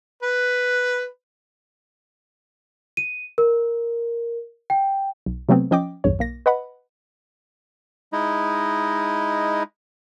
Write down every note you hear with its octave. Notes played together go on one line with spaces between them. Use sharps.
B4
D#7
A#4
G5
B1
C3 F#3 A3 B3 C4
F3 C#4 D#5 G5 D6
B1 E2 G2 C#5
B1 A#3 A#6
B4 D#5 F#5 B5
G#3 D#4 E4